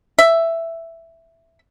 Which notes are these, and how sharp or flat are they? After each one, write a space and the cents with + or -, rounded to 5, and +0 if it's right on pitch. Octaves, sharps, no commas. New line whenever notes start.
E5 +5